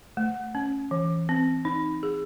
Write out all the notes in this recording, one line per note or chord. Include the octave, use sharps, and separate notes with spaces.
A3
C#4
E3
C4
D#4
G#4